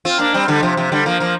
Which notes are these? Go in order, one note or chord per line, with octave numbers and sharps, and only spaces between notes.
C4 F4
A#3 D4
G3 C4
D3 G3
C3 F3
C3 F3
D3 G3
F3 A#3
F3 A#3